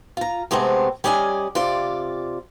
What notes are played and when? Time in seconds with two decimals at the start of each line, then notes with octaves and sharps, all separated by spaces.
0.17 F4 A#5
0.51 C3 G#3 A3 B3 C4
1.04 G3 C#4 D5 D#5 F#5 G#5
1.55 C3 F4 D5